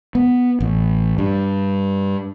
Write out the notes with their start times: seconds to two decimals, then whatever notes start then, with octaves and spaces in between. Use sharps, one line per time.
0.15 B3
0.60 A1
1.18 G2